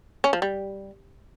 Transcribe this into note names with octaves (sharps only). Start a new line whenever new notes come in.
C#4
F3
G3